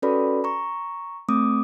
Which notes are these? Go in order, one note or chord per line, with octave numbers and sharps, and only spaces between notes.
C#4 F#4 A4 B4 D5 B5
A#5 C#6
A3 C4 D6 D#6